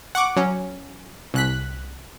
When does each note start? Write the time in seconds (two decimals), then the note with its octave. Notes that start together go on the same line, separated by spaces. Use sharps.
0.15 F#5 C#6 D6
0.37 F#3 C#4
1.34 C2 F#6 B6